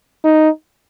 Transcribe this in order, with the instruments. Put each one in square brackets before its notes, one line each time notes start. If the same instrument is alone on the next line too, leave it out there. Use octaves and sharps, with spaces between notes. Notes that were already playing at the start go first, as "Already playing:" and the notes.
[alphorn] D#4